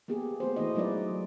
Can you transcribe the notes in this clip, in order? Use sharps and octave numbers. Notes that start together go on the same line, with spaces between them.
A#3 B3 G4 G#4
A3 B3 F#4 C5
E3 A3 A#3 E4 D#5
F#3 G#3 D#4 F4 B4 D5